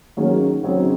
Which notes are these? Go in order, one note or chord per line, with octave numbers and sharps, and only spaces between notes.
D#3 F#3 A#3 C#4 G#4
C#3 F#3 C4 D#4 G#4